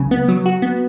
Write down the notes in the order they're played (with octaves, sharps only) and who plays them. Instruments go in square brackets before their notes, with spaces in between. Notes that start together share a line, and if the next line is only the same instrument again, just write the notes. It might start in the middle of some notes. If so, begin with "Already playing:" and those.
Already playing: [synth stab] C#2 C#3 F#3
B3
F#3
F#4
B3